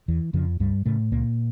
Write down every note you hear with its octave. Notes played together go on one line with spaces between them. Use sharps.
E2 E3
F2 C#3 F3
C#2 G2 G3
A2 C#3 A3
C#2 A#2 A#3